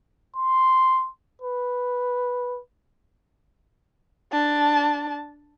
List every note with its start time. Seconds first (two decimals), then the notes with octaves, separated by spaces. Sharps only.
0.36 C6
1.42 B4
4.32 D4 A5